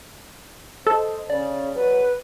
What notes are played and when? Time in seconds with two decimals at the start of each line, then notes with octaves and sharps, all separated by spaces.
0.87 A4 C5 D#5
1.30 C#3 D5
1.76 E2 F#3 F#4 B4